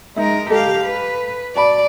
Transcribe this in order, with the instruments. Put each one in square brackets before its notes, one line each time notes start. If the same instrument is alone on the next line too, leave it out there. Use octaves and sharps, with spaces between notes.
[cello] G#3 A#4 [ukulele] D#4 E5
[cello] G4 F5 [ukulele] A4 D#5
[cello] B4
[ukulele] F#4 A5 B5 [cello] D5